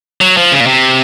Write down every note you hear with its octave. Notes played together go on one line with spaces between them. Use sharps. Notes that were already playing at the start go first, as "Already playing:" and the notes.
F#3
F3
C#3
A#2
C3